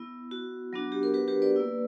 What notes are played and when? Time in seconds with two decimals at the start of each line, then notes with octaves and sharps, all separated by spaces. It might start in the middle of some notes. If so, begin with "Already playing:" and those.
Already playing: B3 E4
0.31 F#4
0.73 F#3 B3 D4 F#4
0.92 G4
1.03 A#4
1.14 G4 B4
1.28 G4 B4
1.42 B4 D5
1.56 A#3 E4